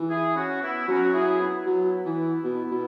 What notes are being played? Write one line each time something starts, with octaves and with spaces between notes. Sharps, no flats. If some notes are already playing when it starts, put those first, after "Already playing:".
Already playing: E3
E4 G#4
C#4 F#4
B3 E4
F#3 C#4 F#4
E4 G#4
B3 E4
F#3
E3
B2
B2